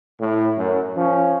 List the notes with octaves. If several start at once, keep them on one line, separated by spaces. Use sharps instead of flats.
A2
F#2
F3 C#4